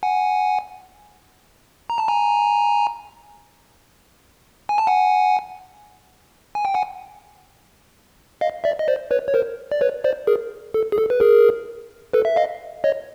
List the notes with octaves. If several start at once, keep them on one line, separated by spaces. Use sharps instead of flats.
F#5 G#5
A#5
A5
G#5 A#5
G#5
A5
F#5 G#5
G#5
G5
F#5 G#5
D#5 F5
D5 E5
D#5
C5 D5
B4 C#5
C#5
A#4 C5
D5
B4 C#5
C5 D5
G#4 A#4
A4
G#4
A4
B4
G#4 A#4
A4 B4
E5
D#5 F5
C#5 D#5